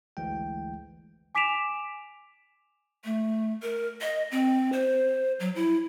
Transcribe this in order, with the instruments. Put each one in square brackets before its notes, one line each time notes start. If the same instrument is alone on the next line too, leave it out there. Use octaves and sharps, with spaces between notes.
[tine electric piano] G#1 D2 E3 G#3 G5
[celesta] G#5 D6 B6 D7 E7 F7
[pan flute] A3
A#4
D#5
C4
C5
F#3
E4